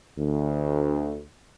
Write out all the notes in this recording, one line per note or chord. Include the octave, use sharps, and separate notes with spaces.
D2